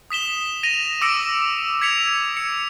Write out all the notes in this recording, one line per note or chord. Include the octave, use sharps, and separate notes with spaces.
D#6 B6 E7 G7
A#6 D#7 F7
D6 E6 A#6 C#7 D7
G#6 B6 C#7 F7
C#7